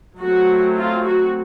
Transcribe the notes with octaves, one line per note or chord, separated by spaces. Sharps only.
F#3 A3 C4 F#4
F4
F#4